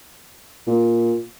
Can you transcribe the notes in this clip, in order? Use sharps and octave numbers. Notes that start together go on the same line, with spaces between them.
A#2